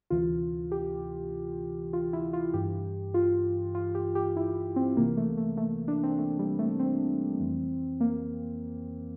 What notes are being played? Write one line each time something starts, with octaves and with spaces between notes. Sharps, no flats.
D2 C3 E3 F4
G4
F4
E4
F4
G2 E3 G4
F4
F4
G4
G4
E4
C4
C2 C3 E3 A#3
A3
A3
A3
D4
C4
A3
G3
A3
C4
F2 E3
A#3